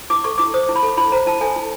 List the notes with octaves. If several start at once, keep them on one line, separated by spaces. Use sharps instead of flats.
E4 D6
A4 C#6
E4 D6
C5 D#6
E4
B5
A4
E4 B5
C5 A#5
E4 A5
A4 G#5
E4